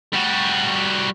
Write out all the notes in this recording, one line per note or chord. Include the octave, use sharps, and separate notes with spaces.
G3 F#4